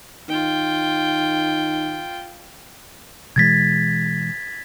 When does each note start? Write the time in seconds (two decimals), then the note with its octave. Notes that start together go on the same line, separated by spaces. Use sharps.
0.28 D#3 F4 G5
3.36 B2 E3 G#3 G#6 A6 B6